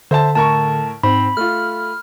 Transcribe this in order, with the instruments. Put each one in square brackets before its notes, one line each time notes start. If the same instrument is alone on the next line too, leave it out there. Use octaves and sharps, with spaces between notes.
[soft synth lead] D3 [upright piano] C5 E5 A5
[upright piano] A2 A#4 C#6 [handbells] A5
[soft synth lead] G#2 [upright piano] C4 [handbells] B5
[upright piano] A3 F4 [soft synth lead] F6